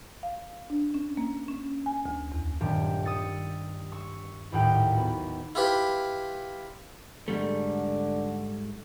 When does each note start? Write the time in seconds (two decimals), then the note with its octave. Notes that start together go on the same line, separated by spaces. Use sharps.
0.23 F5
0.70 D4
0.94 C#4
1.17 A#3
1.48 C#4
1.86 G#5
2.06 D2
2.32 E2
2.61 D#1 G2 G4
3.05 D#6 E6 A6 C#7
3.92 C#6 E6
4.52 A#1 D#2 A2 G4 F#5 G5
4.94 B3 F#4
5.55 E4 F4 G4 B4
7.28 G#2 D3 G3 A3